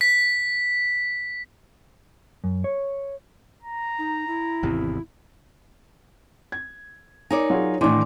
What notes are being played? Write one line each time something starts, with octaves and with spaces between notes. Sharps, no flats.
B6
F#2
C#5
A#5
D#4
E4
G#1 E2 C3
G#6
D#4 A#4 C#5 D5 G#5
F#3 F4 G#4
A2 D#3 E3 D4 G#5 C6 D6